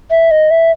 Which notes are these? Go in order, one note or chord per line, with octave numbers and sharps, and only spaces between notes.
E5
D#5
E5